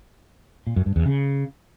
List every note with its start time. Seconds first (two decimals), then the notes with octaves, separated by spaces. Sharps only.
0.67 A#2
0.76 F#2
0.86 G2
0.96 E2
1.06 C#3